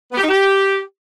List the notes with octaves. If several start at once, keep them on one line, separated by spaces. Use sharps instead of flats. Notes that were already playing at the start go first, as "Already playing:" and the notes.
B3
G4
D#4
G4